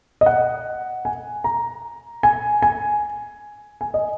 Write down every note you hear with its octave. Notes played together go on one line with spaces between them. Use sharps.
D#5
F#5
G#5
A#5
G#5
G#5
G#5
D#5